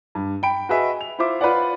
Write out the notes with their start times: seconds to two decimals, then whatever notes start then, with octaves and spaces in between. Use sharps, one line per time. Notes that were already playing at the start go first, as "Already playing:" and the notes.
0.15 G2
0.43 G5 B5 D7
0.69 F#4 G#4 B4 D#5 E5
1.01 F7
1.19 E4 F4 C5 E5 D6
1.41 F4 B4 C#5 D5 F#5